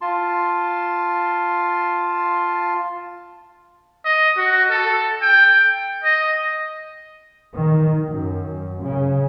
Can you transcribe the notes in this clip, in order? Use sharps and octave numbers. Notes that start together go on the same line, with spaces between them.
F4 A5 C6
D#5
F#4
A4
G5
D#5
D#3
F#2
C#3